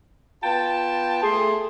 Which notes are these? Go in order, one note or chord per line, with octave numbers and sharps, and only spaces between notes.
B3 F4 G5 A5
A3 G#4 C6